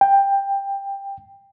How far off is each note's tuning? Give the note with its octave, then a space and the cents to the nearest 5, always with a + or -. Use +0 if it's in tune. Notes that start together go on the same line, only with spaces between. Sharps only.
G5 +15